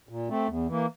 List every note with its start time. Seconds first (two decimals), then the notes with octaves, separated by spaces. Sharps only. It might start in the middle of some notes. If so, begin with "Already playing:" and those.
0.09 A#2
0.29 A3 C4
0.48 E2
0.67 E3 A#3